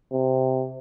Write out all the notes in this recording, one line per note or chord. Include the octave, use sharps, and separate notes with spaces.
C3